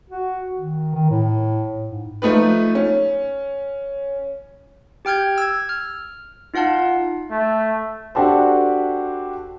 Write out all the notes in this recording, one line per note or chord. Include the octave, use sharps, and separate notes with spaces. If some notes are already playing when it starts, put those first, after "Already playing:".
F#4
D#3
D#3
A2
G#2
F3 A3 D#4 B4
C#4
G4 G5 F6 G6 G#6
E6 G#6
F6
D#4 F4 F5 F#5 A5
A3
D4 F#4 G4 A4 C5